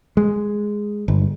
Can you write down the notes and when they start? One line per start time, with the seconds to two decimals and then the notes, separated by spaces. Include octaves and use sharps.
0.17 G#3
1.08 G1